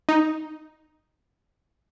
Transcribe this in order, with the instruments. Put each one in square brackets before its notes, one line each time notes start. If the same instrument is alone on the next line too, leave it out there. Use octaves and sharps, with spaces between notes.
[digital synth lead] D#4